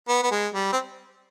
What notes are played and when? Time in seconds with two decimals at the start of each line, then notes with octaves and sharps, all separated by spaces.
0.09 B3
0.23 B3
0.32 G#3
0.54 G3
0.72 C4